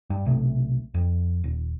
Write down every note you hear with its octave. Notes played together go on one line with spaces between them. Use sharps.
G2
B1 C3 A3
F2
D#1